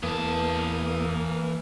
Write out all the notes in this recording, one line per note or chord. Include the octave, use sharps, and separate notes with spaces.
E2 E3 A#3 B4 A5 D#6